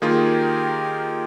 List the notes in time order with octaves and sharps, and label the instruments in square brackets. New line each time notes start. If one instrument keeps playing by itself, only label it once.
[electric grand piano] D#3 A#3 F4 G#4 [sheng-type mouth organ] G4 A#4